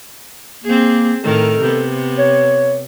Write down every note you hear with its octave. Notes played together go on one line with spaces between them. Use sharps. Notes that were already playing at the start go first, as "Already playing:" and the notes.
A#3 C4 G#4
A2 D#3 A4 A#4
C3 B3
C#5